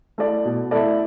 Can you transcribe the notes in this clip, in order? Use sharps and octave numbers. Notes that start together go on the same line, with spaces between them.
A3 E4 A4 D5
B2
A3 E4 A4 D5